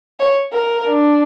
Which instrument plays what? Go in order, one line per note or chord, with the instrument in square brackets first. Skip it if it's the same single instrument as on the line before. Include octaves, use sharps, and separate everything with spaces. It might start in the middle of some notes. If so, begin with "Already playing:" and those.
[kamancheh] C#5
A#4
[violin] D4